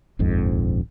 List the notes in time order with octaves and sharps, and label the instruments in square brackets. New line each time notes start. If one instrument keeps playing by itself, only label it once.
[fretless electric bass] D#1 A#1 F2 G#2